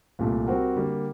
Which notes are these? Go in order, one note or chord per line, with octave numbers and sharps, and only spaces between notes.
C2 A#2 A3
G3 C4 F#4 A#4
D3 G3 A#3